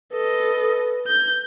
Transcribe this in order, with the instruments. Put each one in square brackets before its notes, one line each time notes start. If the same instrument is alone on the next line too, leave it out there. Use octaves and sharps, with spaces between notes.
[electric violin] A4 D#5 [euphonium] B4
[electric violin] G6